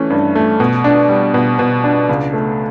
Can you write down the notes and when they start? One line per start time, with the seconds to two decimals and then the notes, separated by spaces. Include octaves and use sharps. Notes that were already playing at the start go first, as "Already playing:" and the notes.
Already playing: E3 A3 C#4
0.10 G2
0.35 A3
0.60 B2
0.84 D4
1.09 G3
1.34 B2
1.59 B2
1.84 D4
2.09 C#2
2.33 A3